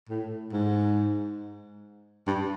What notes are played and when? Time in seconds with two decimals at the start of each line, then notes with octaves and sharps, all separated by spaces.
0.09 A2
0.52 G#2
2.27 G2